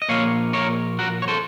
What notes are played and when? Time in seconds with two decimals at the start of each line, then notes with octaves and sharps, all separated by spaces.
0.02 D#5
0.09 A#2 F3 A#3 F4 C#5 F5
0.53 A#4 C#5
0.99 F#4 A#4
1.22 C#5
1.28 A4 C5